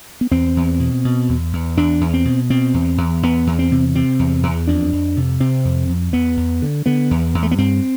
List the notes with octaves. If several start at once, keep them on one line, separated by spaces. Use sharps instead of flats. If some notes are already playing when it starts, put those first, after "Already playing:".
B3
E2 C4
E2
B2
B2
E2
E2
E2 D4
E2
C4
B2
B2 C4
E2
E2
E2 B3
E2
C4
C3
C3 C4
E2
E2
F2 D4
F2
C3
C3 C4
F2
F2
E2 B3
E2
D3
D3 B3
E2
E2
A3
B3
G2 C4